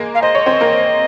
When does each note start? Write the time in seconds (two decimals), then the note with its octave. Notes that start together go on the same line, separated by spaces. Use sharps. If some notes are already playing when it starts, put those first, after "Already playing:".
Already playing: G#3 A#3 G#4 A#4
0.15 F5
0.22 C5 D#5
0.35 C#5
0.46 C4 C5
0.61 A#3 A#4